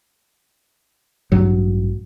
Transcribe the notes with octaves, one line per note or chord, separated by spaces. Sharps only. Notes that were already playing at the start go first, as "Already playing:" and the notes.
A1 G2 F#3